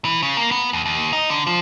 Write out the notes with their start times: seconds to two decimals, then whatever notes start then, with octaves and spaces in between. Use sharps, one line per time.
0.05 E3
0.22 C#3
0.37 A#3
0.51 B3
0.73 D#2
0.86 D#2
1.13 D#4
1.30 D3
1.47 F3